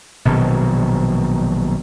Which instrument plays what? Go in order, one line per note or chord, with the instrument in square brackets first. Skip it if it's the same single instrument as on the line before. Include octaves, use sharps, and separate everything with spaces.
[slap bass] A#1 B2 D#3 F#3